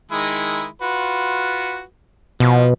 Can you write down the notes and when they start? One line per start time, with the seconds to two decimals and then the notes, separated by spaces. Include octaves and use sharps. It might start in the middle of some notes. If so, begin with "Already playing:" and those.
0.11 D#3 G#3 E4
0.82 F4 F#4 B4
2.40 B2 F3